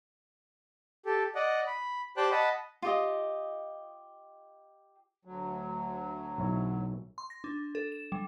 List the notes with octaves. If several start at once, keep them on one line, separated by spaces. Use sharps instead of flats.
G4 A4
D5 D#5 F#5
B5
G4 C5 D5 G5 A5 F#6
D#5 F#5 A5 B5
F4 G4 D#5
D2 F#3
B1 E4 C#5
C6
A#6
D4
A4
E7
G3